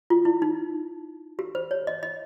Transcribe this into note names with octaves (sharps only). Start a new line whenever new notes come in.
F4
E4
D#4
G4
C5
C#5
D#5
D#5